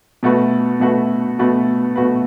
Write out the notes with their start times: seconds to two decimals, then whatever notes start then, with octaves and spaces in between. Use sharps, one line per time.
0.23 B2 A3 F#4 B4
0.80 B2 A3 F#4 B4
1.39 B2 A3 F#4 B4
1.96 B2 A3 F#4 B4